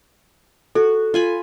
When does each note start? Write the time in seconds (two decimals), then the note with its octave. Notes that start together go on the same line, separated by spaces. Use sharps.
0.75 F#4 A4
1.14 F4 G#5 B5